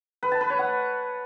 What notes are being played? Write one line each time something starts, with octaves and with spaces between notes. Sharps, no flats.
B4
A5
B4
C#5
F#5